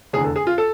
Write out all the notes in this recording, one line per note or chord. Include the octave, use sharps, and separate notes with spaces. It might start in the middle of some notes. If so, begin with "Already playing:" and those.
F1 E2 D3 G#4
A4
G#4
F4
A4